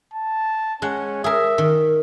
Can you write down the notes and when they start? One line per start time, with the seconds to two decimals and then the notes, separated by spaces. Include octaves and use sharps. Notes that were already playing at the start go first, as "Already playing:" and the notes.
0.13 A5
0.82 G#3 C#4 F#5
1.24 G#4 A#4 E5
1.58 D#3